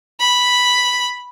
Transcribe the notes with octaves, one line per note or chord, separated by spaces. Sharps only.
B5